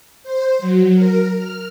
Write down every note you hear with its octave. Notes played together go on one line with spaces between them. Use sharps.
C5
F#3
A#4
F6